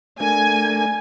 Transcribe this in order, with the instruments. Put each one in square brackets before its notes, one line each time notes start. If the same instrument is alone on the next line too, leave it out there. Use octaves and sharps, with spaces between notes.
[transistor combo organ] A3 D4 A#4 [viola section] G#5